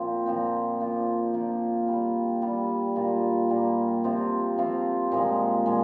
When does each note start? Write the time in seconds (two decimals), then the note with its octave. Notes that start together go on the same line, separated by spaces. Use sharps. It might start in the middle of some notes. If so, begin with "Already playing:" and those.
Already playing: A#2 F3 C4
0.26 A#2 F3 C4
0.80 F3 A#3 D4 F4
1.34 F3 A#3 D4 F4
1.88 G3 D4 F4
2.42 G3 D4 F4
2.96 A#2 G3 A#3 F4
3.50 A#2 G3 A#3 F4
4.04 C3 F3 C4 F4
4.58 C3 F3 C4 F4
5.12 A#2 F3 G#3
5.66 A#2 F3 G#3